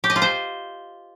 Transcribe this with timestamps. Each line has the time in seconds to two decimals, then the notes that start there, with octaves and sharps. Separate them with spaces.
0.04 G4
0.10 D#5
0.16 F4
0.22 C5